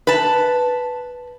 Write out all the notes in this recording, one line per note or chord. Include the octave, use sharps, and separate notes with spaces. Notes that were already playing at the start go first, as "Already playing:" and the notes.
B4 A5